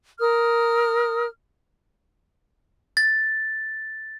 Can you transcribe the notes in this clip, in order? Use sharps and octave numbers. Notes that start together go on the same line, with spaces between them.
A#4 D#6 F6
A6